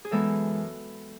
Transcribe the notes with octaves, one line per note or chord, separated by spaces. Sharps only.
G#4
F#2 E3 G#3 B3 A4